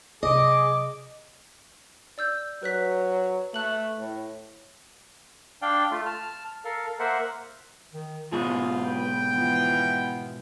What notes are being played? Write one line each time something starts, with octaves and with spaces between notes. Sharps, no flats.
C3 F#3 G#4 D#5 D6
D5 E6 G6
F#3 B4 F#6 B6
A3 F#6 F#7
A2
D4 D5 F5 G5
A3 F4
A5 F6
A4 A#4 F5
A#3 A#4 C5 E5 F#5
D#3
G#2 B2 F4 G#4
B4 G5
E3 F3 B3